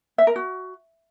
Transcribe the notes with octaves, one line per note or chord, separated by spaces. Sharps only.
E5
A#4
F#4